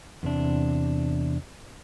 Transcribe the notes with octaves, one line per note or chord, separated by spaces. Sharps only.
E2 C3 D4